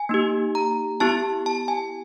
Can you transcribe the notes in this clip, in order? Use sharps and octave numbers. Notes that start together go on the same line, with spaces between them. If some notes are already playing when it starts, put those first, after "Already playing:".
Already playing: G#5
A#3 D#4 G4
A#5
B3 E4 G4 A5
A5
G#5